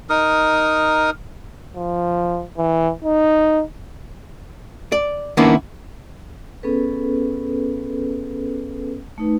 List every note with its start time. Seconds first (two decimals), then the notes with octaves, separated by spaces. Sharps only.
0.10 D#4 A#4 D#6
1.76 F3
2.58 E3
3.04 D#4
4.92 D5
5.37 D#3 A#3 B3 C#4 D4 E4
6.63 B3 C#4 G#4 A4 B4
9.18 A3 D#4 B4